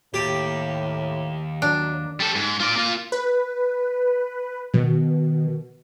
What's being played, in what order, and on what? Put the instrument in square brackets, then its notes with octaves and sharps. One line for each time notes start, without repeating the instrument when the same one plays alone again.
[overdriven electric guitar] D#2 [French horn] A2 [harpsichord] G4
[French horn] F#3 [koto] D4
[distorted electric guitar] G3 A4
G#2
F4 D5
A#3 F4
[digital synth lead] B4
[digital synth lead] B2 [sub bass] D#3